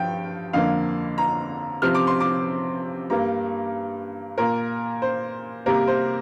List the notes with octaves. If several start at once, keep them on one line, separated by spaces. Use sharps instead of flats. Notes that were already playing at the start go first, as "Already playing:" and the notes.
Already playing: G2 F3 G5
F2 D3 A#3 F5
A#5
C3 F3 C4 F6
D6
C6
D6
G2 G3 A#3 A#5
A#2 A#3 A#4
C5
C3 G3 A#3 A#4
C5